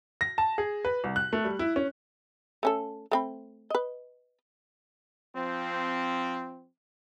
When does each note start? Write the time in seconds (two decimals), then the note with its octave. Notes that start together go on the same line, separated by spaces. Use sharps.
0.21 A#6
0.38 A5
0.58 G#4
0.85 B4
1.04 C2
1.16 F#6
1.33 A3
1.45 G3
1.59 E4
1.76 C#4
2.63 A3 C#4 A4
3.11 A3 C4 B5
3.70 B4 D#5
5.34 F3 C4